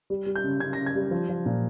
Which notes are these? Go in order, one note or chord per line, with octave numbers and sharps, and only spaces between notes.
G3
G3
G6
C#3
C#3 G#6
C#3 A#6
G#6
G3
F3
F3
A#2